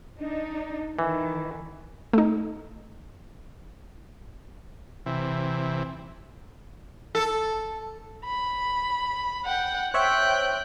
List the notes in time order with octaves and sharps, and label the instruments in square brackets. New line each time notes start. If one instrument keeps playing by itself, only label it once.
[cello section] D4 D#4
[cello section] D#3 [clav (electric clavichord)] E3
[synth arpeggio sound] A3 D#4
[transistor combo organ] C3 E3
[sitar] A4
[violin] B5
F#5 G5
[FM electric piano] C5 C#5 E5 [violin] G5 F#6